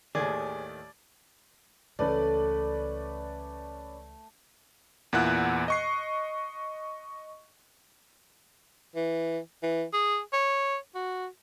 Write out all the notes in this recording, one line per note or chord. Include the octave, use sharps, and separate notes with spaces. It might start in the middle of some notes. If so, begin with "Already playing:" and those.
D#2 A2 D#3 G#4 D5 G#6
C#2 E3 A3 C#4 B4 D5
E2 A#2 E4 F#5 F#6
D#5 C#6 C7
E3
E3
G#4
C#5
F#4